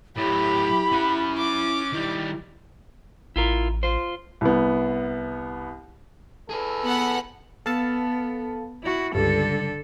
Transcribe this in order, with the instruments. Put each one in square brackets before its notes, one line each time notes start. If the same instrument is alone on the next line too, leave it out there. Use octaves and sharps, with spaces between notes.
[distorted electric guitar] A2 F#3 [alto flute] E4 [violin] G4 [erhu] B5
[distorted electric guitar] C#4 F#5
[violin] D6
[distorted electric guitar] D#3 G3 [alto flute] E4
[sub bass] A1 [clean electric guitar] E4 F4 A#4
[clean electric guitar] F4 C5
[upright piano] C2 B3
[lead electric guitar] G#4 B4 [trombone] A4
[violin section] B3 F#5
[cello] B3 [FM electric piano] A4 F5 A5
[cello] E4 F#4
[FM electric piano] C#2 G2 [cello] D3 A4